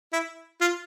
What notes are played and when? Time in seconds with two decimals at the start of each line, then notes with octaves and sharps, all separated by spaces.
0.13 E4
0.61 F4